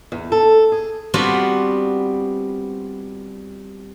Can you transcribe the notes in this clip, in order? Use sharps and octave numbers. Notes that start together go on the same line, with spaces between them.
E2
A4
G#4
G3 B3 C4 D4 F4 F#4